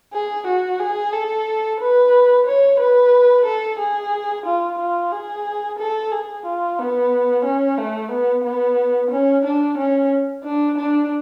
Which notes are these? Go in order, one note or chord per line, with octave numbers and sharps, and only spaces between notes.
G#4
F#4
G#4
A4
B4
C#5
B4
A4
G#4
F4
F4
G#4
A4
G#4
F4
B3
C#4
A3
B3
B3
C#4
D4
C#4
D4
D4